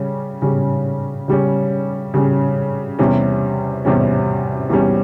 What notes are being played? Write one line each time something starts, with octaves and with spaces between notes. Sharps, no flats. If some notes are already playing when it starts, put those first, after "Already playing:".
Already playing: C#3 G3 C#4
C#3 G3 C#4
C#3 G3 C#4
C#3 G3 C#4
E2 C3 G3 C#4
E2 C3 G3 C#4
E2 C3 G3 C#4